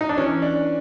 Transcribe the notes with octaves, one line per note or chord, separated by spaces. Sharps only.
D#4
D4
E3 C#4
D4